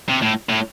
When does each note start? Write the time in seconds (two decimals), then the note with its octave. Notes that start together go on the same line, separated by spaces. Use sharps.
0.09 C3
0.22 A2
0.49 A2